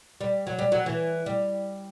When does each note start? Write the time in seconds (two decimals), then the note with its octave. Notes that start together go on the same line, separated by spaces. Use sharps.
0.21 G3
0.47 F#3
0.59 G3
0.72 F#3
0.86 E3
1.26 G3